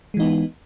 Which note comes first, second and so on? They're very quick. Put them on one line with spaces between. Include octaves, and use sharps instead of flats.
G#3 E3 D#4 B3